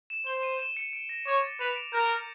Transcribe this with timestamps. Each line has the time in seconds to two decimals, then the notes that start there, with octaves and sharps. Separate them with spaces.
0.10 E7
0.26 C5 G7
0.43 D#7
0.59 E7
0.77 C#7
0.93 D7
1.09 A#6
1.27 C#5 D6
1.43 A6
1.60 B4 F7
1.76 D7
1.93 A#4 G6
2.09 F7